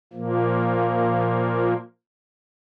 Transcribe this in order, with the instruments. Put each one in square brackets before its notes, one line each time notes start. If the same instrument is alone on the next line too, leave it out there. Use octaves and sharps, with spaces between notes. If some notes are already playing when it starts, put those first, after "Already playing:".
[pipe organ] A#2 F3 A#3